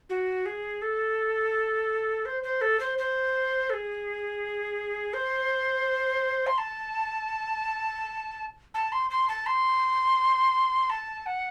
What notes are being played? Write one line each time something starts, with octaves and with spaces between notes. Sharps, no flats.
F#4
G#4
A4
C5
C5
A4
C5
C5
A4
G#4
C5
C6
A5
A5
C6
C6
A5
C6
A5
F#5